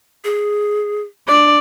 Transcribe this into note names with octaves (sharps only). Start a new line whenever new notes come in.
G#4
D4 D5